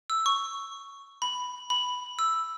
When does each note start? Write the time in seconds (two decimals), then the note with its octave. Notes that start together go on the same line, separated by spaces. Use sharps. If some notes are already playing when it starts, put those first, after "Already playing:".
0.10 E6
0.26 C#6
1.22 B5
1.70 B5
2.19 E6